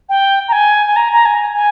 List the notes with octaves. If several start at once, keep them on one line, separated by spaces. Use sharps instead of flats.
G5
A#5
G#5
G#5
A#5
A#5
G#5
G#5